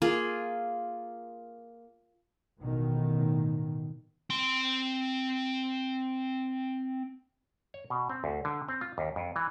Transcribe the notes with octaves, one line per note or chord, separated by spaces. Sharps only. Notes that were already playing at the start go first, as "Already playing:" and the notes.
A#3 F4 G#4
A1 B2 D#3
C4 C6
C#5
B2
C4
D2
D3
C4
F4
D#2
F2
E3